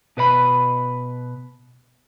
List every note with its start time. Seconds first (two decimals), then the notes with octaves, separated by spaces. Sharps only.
0.17 B2 B4 D5 B5